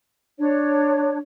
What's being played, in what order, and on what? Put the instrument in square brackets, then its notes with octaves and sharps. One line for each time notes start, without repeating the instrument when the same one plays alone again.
[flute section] D4 C#5